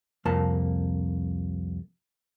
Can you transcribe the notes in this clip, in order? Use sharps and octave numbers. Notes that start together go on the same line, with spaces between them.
C2 F2 A#3 A5